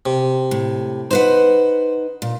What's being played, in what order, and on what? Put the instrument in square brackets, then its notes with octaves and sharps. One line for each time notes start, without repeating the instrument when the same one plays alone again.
[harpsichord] C3
[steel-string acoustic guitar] A2
[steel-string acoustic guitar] D#4 B4 F#5 [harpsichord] C5
[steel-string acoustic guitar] A#2